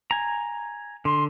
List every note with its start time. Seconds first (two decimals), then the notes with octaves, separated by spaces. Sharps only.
0.11 G#5 A#5
1.05 D3 C6